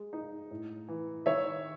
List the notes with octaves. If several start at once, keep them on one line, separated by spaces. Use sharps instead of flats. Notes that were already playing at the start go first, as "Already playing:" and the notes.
Already playing: G#3
D#4
A2
E3
D#3 C#5 E5